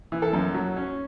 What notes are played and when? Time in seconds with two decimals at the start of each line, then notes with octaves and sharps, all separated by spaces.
0.12 E3
0.22 A4
0.33 F#2
0.55 F#3
0.76 C#4